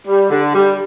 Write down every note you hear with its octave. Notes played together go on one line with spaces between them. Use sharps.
G3
D3
G3